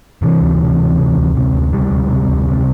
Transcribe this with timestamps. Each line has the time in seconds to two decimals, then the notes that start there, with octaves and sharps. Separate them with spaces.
0.22 C3 E3
0.41 D2
0.60 C3
0.79 D2
0.97 C3
1.17 D2
1.35 C3
1.53 D2
1.72 C3 G3
1.91 D2
2.09 C3
2.28 D2
2.47 C3